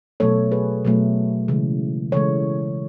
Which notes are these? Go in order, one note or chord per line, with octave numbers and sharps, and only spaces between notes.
B2 F#3 A3 A4 C#5
G#4 B4
B2 F#3 A3
C#3 E3 G#3
C#3 E3 G#3 A4 C#5